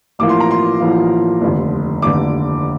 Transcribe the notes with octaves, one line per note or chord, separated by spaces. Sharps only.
A1 A2 F3 A#3 D6
C6
A#5
C6
A1 A2 F3 A#3
F1 D#2 D3
F1 D#2 D3 D6